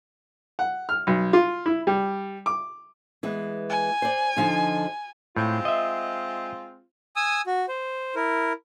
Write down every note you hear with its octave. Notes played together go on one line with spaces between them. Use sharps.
F#5
F6
B1
F4
E4
G3
D6
E3 G#3 B3
G#5
C5 D5
D3 F3 D#4
A2 G#3 C4 F4
D#5 E5
G#5 D#6 E6
F#4
C5
E4 A#4